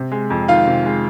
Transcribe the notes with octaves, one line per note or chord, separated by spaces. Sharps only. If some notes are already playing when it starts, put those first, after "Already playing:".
Already playing: C3
G#3
F2
D#3 F4 F5
C3
G#3